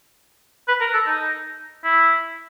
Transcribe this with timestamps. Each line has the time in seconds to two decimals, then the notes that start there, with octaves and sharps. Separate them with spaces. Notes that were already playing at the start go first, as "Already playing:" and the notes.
0.68 B4
0.81 A#4
0.94 A4
1.06 D#4
1.84 E4